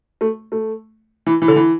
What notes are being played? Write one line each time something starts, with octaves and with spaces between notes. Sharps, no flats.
A3
A3
E3
E3
D3
E3